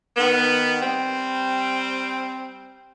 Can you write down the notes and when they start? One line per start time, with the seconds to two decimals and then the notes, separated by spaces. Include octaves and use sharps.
0.17 D#3 B3
0.81 G3 C4